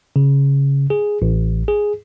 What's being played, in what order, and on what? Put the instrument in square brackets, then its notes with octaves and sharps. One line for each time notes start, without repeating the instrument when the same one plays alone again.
[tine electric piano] C#3
G#4
A1
G#4